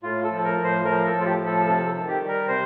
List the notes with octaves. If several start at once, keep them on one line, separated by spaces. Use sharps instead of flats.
A2 F4
A4
F3
A4
A#4
A2
C5
F3 A#4
A4
A2
F4
G4
F3
A4
C3 A4
A4
D#3
G4
G3
A#4
C3 C5